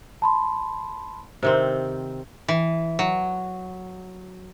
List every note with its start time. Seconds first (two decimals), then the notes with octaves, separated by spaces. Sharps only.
0.22 A5 B5 C6
1.43 C3 D#3 C4
2.48 E3
2.99 F#3